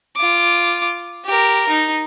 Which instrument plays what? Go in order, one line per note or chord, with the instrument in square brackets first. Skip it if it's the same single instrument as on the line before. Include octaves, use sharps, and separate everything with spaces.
[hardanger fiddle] F4 D6
G4 A#4
D#4